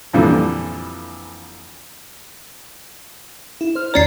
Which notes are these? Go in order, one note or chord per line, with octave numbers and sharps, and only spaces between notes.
F2 A#2 D3 E3 F3 G3
E4
C5 F6
D#2 C#4 C#5 D5 A#5 C7